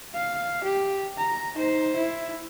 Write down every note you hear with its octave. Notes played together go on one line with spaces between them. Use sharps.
F5
G4
A#5
D#4 C5
E4